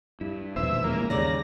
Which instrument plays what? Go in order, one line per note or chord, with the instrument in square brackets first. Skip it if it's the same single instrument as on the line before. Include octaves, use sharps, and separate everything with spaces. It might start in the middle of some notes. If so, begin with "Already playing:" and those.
[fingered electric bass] G2 [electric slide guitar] E4
[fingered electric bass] E1 A#1 D#2 [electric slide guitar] B4 C5 [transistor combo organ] E5
[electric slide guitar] E3 G#3 C#4 [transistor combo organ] A#3
[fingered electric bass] D#2 [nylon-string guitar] C#3 D5 [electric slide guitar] G3 [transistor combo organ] A#5